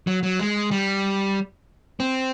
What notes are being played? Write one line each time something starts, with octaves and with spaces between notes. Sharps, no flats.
F#3
F#3
G#3
G3
C4